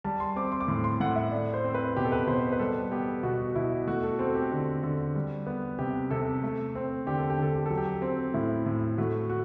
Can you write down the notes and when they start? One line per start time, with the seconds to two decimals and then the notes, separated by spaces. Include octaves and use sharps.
0.04 G3 A5
0.20 C6
0.36 C4 D6
0.52 C6
0.61 D6
0.68 A2 C6
0.84 C6
1.00 A2 F#5
1.16 E5
1.32 A3 D5
1.54 C5
1.64 C4
1.74 B4
1.96 B2 G4
2.05 A4
2.12 B4
2.27 B2 C5
2.52 B4
2.59 G3 A4
2.92 B3 G4
3.23 B2 F#4
3.55 B2 E4
3.87 A3 F#4
4.03 A4
4.19 C4 A4
4.35 G4
4.52 D3
4.83 D3
5.15 G3
5.47 B3
5.79 C3 G4
6.11 C3 A4
6.43 A3
6.75 C4
7.06 D3 G4
7.19 A4
7.30 G4
7.38 D3 A4
7.54 G4
7.66 F#3 A4
7.77 G4
8.02 C4
8.34 A2 E4
8.66 A2
8.98 A3 F#4
9.30 F#4